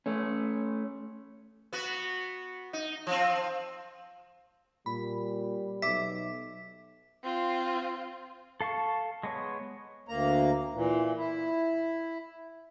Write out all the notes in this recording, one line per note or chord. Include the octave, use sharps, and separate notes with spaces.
A3 C#4
B3 F#4
D#4
F3 C4
A#2 G3 B5
B1 E5 D6 B6
C4 F4
A4 F5 A5 C#6
G#3 B3 C#5
D2 A#3 A#5
A#2 E3
E4